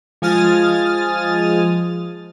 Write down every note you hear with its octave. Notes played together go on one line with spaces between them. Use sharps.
F3 G#3 G#5 D#6 F6 A6